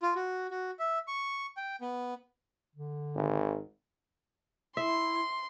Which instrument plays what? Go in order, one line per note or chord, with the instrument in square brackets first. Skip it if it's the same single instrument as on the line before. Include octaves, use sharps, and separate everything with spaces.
[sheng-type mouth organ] F4
F#4
F#4
E5
C#6
G5
B3
[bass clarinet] D3
[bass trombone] G#1
[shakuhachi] E4 [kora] E5 [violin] C6